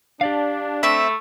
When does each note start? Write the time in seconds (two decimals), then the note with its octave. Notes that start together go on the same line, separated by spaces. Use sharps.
0.21 D4 G4 D5 F5
0.83 A3 C4 E5 B5